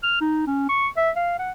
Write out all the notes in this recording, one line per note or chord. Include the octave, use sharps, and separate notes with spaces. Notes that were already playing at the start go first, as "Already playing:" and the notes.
F6
D#4
C#4
C#6
E5
F5
F#5